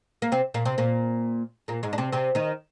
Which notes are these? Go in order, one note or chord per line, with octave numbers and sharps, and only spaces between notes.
A#3
C3 C4
A#2 A#3
C3 C4
A#2 A#3
A#2 A#3
G#2 G#3
D4
C3 C4
C3 C4
D#3 D#4